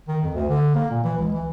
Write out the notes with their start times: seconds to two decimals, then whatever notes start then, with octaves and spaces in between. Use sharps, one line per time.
0.08 D#3
0.23 F2
0.34 D2
0.49 D3
0.75 A#3
0.91 A#2
1.03 E3
1.18 C#2
1.32 E3